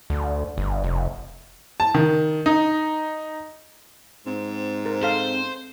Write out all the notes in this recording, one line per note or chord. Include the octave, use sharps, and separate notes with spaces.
D2
G1
F1
A5
D#3
D#4
G#2 C4
A#4
A4 C5 F5